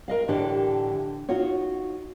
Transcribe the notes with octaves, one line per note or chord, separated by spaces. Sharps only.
A#4 D#5 F5
A2 D3 E3 D4 G4 A4
D#4 F4 F#4 C#5